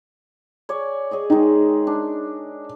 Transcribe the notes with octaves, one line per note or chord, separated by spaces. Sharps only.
C#5 D5 G#5
G#4 C#5 D#5
D#3 G#3 D#4
D4